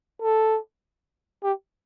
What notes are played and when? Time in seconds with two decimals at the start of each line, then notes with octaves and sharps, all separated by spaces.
0.22 A4
1.43 G4